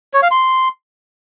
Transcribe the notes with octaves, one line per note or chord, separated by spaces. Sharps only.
C#5
F5
C6